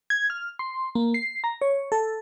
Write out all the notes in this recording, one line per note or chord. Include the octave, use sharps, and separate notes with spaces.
G#6
F6
C6
A#3
C7
A#5
C#5
A4